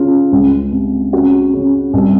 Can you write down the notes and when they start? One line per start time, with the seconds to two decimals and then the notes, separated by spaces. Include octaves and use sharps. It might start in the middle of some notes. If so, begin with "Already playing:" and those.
Already playing: C#3 F4
0.32 C#2
0.72 C3
1.13 C#3 F#4
1.53 C#3
1.93 C2